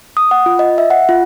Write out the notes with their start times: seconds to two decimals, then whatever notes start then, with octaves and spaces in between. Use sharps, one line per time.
0.17 D#6
0.31 F#5
0.46 F4
0.59 D#5
0.78 E5
0.90 F#5
1.09 F4